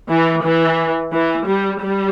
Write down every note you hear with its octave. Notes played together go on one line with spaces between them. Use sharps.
E3
E3
E3
G3
G3